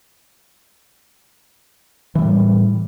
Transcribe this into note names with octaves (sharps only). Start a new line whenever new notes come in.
A2 E3 F3 G3